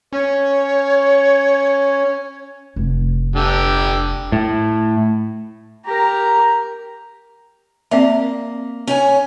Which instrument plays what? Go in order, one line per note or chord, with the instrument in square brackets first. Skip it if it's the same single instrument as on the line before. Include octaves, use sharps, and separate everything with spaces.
[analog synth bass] C#4 [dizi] C#5
[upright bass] F1
[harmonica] D3 G4
[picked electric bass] A2
[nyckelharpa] G4 A#4 [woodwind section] A#5
[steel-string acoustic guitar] A#3 [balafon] C4 D5 E5
[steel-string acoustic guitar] C#4 C#5 G#5